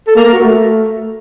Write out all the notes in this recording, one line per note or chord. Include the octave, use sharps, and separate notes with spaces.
A4
A#3
A#4
F#4
A3